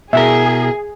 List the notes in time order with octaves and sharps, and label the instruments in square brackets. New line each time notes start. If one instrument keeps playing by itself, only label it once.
[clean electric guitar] B2 E4 A#4 [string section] G#4 [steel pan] E5